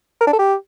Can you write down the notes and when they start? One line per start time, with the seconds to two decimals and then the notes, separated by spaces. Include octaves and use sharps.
0.21 A#4
0.27 D4
0.33 A4
0.39 G4